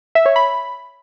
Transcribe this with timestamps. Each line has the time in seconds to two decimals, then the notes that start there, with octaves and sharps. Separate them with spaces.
0.15 E5
0.26 C#5
0.36 B5